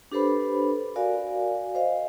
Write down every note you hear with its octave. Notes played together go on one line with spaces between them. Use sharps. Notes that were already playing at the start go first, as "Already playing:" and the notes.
D4 G4 A4 B4 C5 B5
F#4 A#4 D5 F5 G#5
C5 D#5 F5